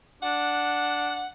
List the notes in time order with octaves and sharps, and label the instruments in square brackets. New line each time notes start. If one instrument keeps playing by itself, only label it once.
[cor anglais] D4 [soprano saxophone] F#5